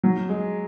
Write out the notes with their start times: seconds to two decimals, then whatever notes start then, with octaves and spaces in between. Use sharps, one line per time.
0.03 F#3
0.29 G#3